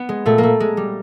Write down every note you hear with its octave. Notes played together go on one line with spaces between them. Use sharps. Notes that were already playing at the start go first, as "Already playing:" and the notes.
Already playing: B3
G#3
A#2 A3
A#3
A3
G#3
G3